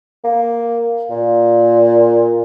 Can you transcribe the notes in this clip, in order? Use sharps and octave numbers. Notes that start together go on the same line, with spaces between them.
A#3
A#2